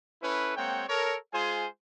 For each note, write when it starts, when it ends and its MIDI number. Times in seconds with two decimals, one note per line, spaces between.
0.23 0.56 61
0.23 0.56 64
0.23 0.56 69
0.23 0.56 71
0.57 0.84 56
0.57 0.84 58
0.57 0.84 60
0.57 0.84 73
0.57 0.84 78
0.57 0.84 79
0.89 1.16 69
0.89 1.16 70
0.89 1.16 73
1.33 1.67 56
1.33 1.67 65
1.33 1.67 68
1.33 1.67 72
1.33 1.67 80